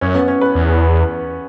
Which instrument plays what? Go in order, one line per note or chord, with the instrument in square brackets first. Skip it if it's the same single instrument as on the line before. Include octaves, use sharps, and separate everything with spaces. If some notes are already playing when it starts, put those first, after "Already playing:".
[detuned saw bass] F#2 [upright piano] C#4
[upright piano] B3
C#4
B4
[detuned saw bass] E2